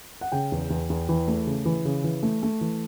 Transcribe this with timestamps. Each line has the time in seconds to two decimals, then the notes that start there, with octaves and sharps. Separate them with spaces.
0.21 F#5
0.32 C#3 G5
0.52 E2
0.70 E2
0.90 E2
1.09 E3
1.28 A3
1.47 C#3
1.65 E3
1.85 C#3
2.04 E3
2.23 A3
2.43 A3
2.61 E3